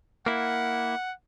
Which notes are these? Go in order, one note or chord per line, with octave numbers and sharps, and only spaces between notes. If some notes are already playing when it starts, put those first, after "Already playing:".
A#3 E4 F#5